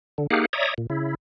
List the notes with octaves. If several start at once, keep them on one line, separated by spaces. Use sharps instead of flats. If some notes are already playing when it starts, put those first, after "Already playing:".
D3
A#3 D#4 G4 G#4 F5 F#5
C#5 D5 E5 A#5 D#6
A#2
C#3 E4